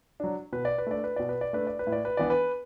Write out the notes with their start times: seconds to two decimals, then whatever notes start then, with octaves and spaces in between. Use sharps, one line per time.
0.20 F#3 D4
0.53 B2 B4
0.65 D5
0.78 B4
0.87 A3 D4 D5
1.04 B4
1.16 B2 D5
1.29 B4
1.41 D5
1.53 A3 D4 B4
1.67 D5
1.79 B4
1.87 A2
1.92 D5
2.05 B4
2.17 E3 B3 D4 D5
2.30 B4